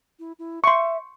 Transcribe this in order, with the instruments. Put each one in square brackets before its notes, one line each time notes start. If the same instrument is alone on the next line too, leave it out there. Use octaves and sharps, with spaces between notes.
[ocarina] E4
E4
[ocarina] E5 [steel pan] C6 C#6